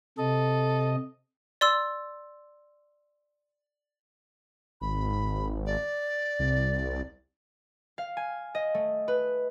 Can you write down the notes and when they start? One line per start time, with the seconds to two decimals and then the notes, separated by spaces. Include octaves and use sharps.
0.18 C3 A4 D#5
1.61 D5 C6 E6
4.81 G#1 B5
5.66 D5
6.39 C2
7.98 F5
8.17 G#5
8.55 D#5
8.74 A3
9.08 B4